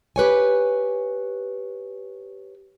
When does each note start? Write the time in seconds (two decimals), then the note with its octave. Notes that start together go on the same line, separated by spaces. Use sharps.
0.16 G4 B4 C#5 G#5